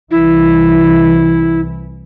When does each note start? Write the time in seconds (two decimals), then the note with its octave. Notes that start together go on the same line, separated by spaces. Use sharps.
0.11 C2 E3 E4